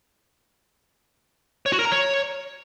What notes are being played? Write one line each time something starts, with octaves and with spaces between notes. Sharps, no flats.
C#5
F#4
A#4
A#5
C#5